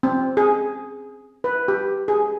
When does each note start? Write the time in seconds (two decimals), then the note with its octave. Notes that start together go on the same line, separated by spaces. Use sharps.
0.03 C4
0.37 G#4
1.44 B4
1.68 G4
2.08 G#4